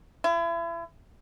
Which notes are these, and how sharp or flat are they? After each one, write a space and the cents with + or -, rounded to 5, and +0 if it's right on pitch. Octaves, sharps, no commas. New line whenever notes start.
E4 +35